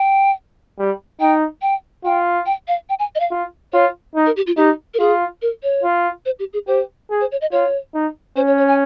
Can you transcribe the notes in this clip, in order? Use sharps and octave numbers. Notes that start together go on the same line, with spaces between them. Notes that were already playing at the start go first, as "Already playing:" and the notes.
Already playing: G5
G3
D#4 G5
G5
F4 G5
G5
F5
G5
G#5
D#5
F5
F4
F4 C#5
D#4
A#4
G4
F4
D#4 G4
A#4
F4 G#4
A#4
C#5
F4
C5
G4
G#4
G4 C5
G#4
C5
C#5
D#5
F4 C#5
D#4
C#4 C5
C#5
C#5
G#5